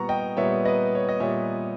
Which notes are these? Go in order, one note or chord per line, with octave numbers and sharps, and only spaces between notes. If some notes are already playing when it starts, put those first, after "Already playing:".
Already playing: A#2 G3 B3 A#5 C#6
D#5 G5
A#2 G3 B3 C#5 E5
B4 D#5
C#5
D#5
A#2 G3 B3 C#5 E5